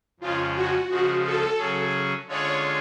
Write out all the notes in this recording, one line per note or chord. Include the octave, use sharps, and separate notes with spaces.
F2 C#3 G#3 C#4 F4
F#4
C#3 F3 G#3 F#4
A4
C#3 F#3 C#4 G#4
D3 G#3 C#4 F4 G#4 C#5